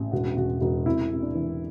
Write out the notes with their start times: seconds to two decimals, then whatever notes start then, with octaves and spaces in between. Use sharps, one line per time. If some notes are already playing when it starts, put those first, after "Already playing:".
Already playing: A1
0.12 E1 F#4
0.37 E1 F#4
0.61 E1 F#4
0.86 C3 E4
1.10 C3
1.22 D4
1.35 E3